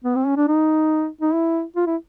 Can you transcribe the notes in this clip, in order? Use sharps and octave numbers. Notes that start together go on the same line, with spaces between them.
B3
C4
C#4
D4
D#4
D#4
E4
F4
E4